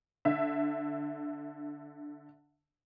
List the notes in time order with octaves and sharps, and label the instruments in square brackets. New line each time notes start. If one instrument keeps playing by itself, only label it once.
[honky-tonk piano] D3 E5